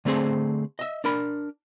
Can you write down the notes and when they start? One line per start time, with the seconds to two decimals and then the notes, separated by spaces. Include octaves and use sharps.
0.05 D3 A3 C4 G#4 C5
0.79 D#5 E5
1.04 D4 A#4 B5